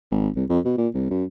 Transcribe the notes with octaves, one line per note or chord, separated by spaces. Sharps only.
G#1
C2
F2
B2
A#2
C2
F#2